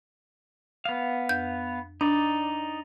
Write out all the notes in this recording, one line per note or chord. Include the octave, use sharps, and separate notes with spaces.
B3 F5
F2 G6
D4 D#4 D5